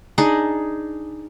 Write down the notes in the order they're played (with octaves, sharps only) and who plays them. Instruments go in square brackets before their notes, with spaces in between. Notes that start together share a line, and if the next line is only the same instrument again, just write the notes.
[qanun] D4 D#4 G#4